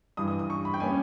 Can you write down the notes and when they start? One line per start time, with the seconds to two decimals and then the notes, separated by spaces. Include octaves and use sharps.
0.17 G2 E3 G3 D#6
0.28 D#6
0.39 D#6
0.50 C#6
0.65 B5
0.74 G5
0.80 G3 A#3 C#4 G#5